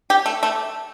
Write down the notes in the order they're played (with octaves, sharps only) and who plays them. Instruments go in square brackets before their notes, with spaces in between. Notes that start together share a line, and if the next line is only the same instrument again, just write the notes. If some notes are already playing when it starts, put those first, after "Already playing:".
[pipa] G4
A3
A3